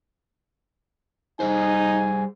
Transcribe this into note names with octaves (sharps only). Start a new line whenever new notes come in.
G3 D#4 G#4 C5 G#5